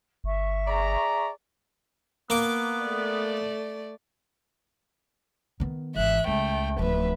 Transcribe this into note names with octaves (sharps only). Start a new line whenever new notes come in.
G1 E5 C#6
G#4 D5 A#5
A#3 B3 D6
A3 D5
D#3 B3
G#1 E3 E5 F#6
C#2 A3 G5
D1 F3 B4 E5